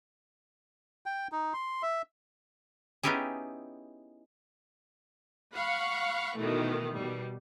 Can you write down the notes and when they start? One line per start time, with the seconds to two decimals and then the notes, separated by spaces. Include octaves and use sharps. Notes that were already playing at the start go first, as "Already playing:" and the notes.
1.06 G5
1.32 D#4
1.54 C6
1.83 E5
3.03 B3 C#4 D#4 E4 G4 G#4
5.54 F5 F#5 B5 C#6
6.38 B2 D#3 E3 A3
6.93 B2 G3